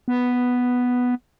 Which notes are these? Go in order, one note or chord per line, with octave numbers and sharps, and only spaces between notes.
B3